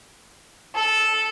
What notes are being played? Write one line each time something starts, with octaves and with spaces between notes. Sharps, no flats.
A4